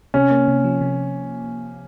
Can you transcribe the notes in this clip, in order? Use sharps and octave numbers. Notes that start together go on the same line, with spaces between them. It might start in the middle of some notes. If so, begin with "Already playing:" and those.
C3 C#4
A#3
C3
F3
C3